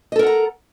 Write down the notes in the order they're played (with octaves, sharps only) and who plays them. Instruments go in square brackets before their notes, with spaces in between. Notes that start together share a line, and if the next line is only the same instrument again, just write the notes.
[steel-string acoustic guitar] D#5
A4
A#4
F#5
A#5